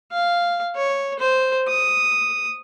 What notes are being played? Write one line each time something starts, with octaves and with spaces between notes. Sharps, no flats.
F5
C#5
C5
D#6